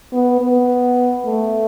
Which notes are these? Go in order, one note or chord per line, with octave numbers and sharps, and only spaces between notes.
B3
B3
A3